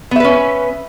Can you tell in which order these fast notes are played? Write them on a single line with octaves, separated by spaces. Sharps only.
B3 E5 B4 C#4